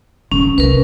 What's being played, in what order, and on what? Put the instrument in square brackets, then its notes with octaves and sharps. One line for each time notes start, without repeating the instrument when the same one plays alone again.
[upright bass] D3 C4 [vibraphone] C#4
[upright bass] C2 [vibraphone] A#4 B4